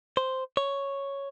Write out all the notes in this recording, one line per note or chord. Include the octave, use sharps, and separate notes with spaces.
C5
C#5